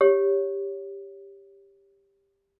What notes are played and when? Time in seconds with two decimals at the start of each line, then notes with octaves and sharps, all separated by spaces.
0.01 G4 C#5